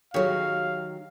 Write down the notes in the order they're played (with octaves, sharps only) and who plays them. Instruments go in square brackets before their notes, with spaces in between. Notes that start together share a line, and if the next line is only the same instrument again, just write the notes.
[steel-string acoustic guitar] D#3 F#3 [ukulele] G4 G#4 C#5 [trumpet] F5